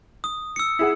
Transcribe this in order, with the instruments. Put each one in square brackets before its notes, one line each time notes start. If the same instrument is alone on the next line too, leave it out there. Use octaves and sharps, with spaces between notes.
[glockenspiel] D#6
E6 C#7
[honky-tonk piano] E4 G#4 F#5